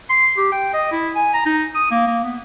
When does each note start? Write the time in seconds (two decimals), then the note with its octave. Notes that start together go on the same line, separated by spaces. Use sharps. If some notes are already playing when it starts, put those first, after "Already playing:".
0.10 C6
0.37 G4
0.52 G5
0.74 D#5
0.92 E4
1.16 G#5
1.34 A#5
1.46 D#4
1.75 D#6
1.92 A#3
2.07 A#3
2.24 B3